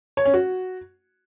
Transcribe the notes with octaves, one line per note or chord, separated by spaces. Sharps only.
C#5
C#4
F#4